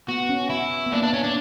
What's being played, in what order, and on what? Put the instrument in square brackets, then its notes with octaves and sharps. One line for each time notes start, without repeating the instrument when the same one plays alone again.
[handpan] B3 [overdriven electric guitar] F#4
[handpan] C#4
[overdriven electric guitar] E4
[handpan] B3
[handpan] A#3 [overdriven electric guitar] D4
[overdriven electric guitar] D4
C#4
D4